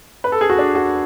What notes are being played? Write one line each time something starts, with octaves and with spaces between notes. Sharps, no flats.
B4
A4
G#4
F#4
D4
F#4